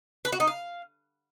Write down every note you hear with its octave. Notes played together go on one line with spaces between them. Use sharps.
B4
F#4
D#4
F5